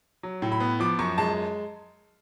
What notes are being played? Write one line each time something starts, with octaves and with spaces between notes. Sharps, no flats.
F#3
A2
B5
B3
F3 D6
F#2 C#6
G#3 A5